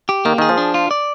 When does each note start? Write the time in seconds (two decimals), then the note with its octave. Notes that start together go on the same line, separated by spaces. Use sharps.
0.09 G4
0.25 D#3 A#3
0.38 D#3 G#4
0.49 F3
0.58 D4
0.74 F4
0.91 D5